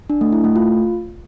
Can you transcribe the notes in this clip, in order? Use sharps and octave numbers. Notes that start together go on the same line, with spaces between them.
D4
A3
E4
A3
F4